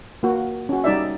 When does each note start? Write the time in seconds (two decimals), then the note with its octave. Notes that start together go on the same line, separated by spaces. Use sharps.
0.23 A#3 F#4
0.69 C#4 F#4
0.84 G3 D#4 D5 E5